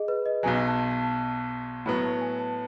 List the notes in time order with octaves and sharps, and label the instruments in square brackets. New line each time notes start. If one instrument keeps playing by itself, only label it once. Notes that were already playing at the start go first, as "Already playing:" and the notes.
Already playing: [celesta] G#4 D#5
B4
D#5
[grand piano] B1 B2 F#3 [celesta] G#5
[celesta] A5
A5
[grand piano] A2 F#3 B3 [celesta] B5
[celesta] A5
G#5
A5